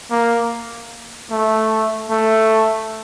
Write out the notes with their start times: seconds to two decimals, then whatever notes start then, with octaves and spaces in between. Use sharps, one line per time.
0.11 A#3
1.31 A3
2.10 A3